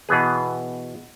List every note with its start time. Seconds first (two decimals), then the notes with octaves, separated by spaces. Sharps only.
0.09 B2 E3 B3 G#4